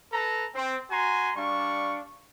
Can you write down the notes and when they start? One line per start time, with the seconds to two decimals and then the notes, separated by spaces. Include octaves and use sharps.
0.12 A4 B4 A#5
0.55 C4
0.91 F#4 G#5 A#5 C6
1.36 G3 D4 F5 C#6